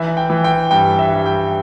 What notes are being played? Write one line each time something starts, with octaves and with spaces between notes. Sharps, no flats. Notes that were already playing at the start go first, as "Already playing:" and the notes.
Already playing: E3 E5
G5
E3
G5
G2 G5
E5
G2
G5